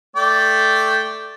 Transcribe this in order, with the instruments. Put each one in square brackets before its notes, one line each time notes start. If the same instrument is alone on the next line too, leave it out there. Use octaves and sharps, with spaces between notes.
[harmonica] A3 D5 G5